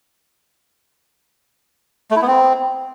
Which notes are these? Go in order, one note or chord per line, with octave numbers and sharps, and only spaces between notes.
A3
E4
B3
C4